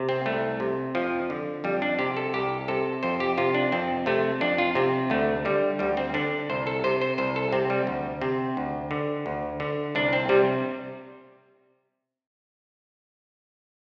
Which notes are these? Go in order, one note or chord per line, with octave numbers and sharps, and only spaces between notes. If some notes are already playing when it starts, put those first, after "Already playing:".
Already playing: C3
C4
C2 A3
C3
F2 F3
D3
F2 G3
D4
C3 G4
A4
C2 G4
C3 A4
F2 C5
G4
C3 F4
D4
F2 C4
C3 A3
F2 D4
F4
C3 C4
D2 A3
D3 G3
D2 G3
C4
D3 D4
C2 C5
A4
C3 C5
C5
C2 C5
A4
C3 C4
G3
D2
C3 C4
D2
D3
D2
D3
C2 D4
C4
C3 G3